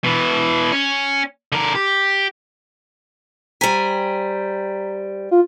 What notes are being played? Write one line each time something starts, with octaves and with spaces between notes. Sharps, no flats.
B2 E3
C#4
D3 A#4
G4
G3 C5 G#5 A#5 B6
F4